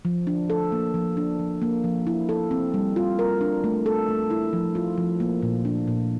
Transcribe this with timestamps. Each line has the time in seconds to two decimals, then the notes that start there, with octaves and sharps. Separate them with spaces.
0.05 F3
0.27 D4
0.50 A4
0.72 A#3
0.94 F3
1.17 D4
1.39 F3
1.62 A#3
1.84 F3
2.07 E4
2.29 A4
2.51 C4
2.74 G3
2.96 F4
3.19 A#4
3.41 D4
3.64 A3
3.86 A4
4.08 A3
4.30 E4
4.53 F3
4.75 F4
4.98 F3
5.20 A#3
5.43 A#2
5.65 D4
5.87 A#2